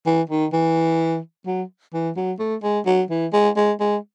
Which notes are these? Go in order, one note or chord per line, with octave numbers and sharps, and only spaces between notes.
E3
D#3
E3
F#3
E3
F#3
A3
G#3
F#3
E3
G#3
G#3
G#3